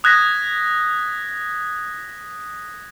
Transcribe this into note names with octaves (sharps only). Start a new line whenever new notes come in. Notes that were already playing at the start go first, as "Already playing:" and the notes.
D#6 F#6 G#6 A#6 B6